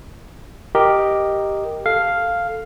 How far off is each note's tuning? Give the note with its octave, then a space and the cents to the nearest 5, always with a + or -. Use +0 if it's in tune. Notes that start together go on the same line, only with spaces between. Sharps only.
G4 +0 A#4 +0 D#5 +0
A4 +0 F5 +0